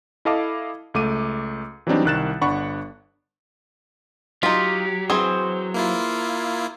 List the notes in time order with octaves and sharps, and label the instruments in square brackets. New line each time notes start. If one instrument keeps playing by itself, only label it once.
[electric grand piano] E4 A4 D#5 F5 A5 D6
C#2 A3 D6 D#7
E3 F#3 G3 C4 D4 D#4
C2 D#3 F#6 A6 E7
G1 D4 F#5 B5 C#6 C#7
[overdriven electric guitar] F#3 [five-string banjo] D#4 F4 [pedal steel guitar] G4
[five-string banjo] E3 C4 G#4 [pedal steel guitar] C5
[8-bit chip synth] A#3 E4 F4